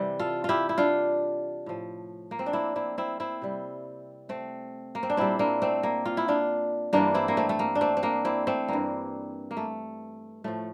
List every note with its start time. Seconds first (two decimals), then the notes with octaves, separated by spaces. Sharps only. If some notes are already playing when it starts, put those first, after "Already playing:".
Already playing: C3 E3 G3
0.19 F4 A4
0.44 E4 F4 G4
0.69 E4
0.78 D4 F4
1.66 A2 F3
2.31 A#3
2.39 C4
2.46 D4
2.53 C4 E4
2.76 C4 E4
2.98 C4 E4
3.20 C4 E4
3.42 C3 G3
4.29 A3 C4
4.95 A#3
5.03 C4
5.10 D4
5.17 A#2 G3 C4 E4
5.39 A#3 D4
5.62 A3 C4
5.83 A#3
6.06 F4
6.17 E4
6.28 D4 F4
6.93 G2 E3 G3 A#3 D4
7.14 C4 E4
7.28 A#3
7.37 A3 C4
7.49 A3
7.59 A#3
7.75 D4
7.81 A3 C4
7.97 C4
8.03 A#3 D4
8.25 C4 E4
8.47 A3 C4
8.68 G2 E3 G3 A#3
9.51 A#3
9.57 A3
10.44 A2 F3 A3